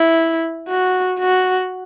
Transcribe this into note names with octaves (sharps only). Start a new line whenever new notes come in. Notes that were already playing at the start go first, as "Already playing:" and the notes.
Already playing: E4
F#4
F#4